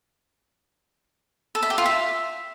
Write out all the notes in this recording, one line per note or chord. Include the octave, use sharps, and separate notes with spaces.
A4
E5
G4
F4
E5